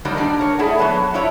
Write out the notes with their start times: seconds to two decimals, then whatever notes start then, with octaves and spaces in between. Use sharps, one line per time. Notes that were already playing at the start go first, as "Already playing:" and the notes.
0.05 G#2 D#3 F#3 G3 A#3 D4
0.16 A#2 G3 D4 D#4
0.39 A#4 C#5
0.58 A3 E4 G#4 A4 D5 F#5
0.79 F#3 B3 B4 C#5 A5
1.14 C#4 E4 F4 C#5 D5